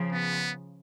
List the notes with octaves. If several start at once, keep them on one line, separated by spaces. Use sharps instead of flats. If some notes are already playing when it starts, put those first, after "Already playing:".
Already playing: C#3 F3
B3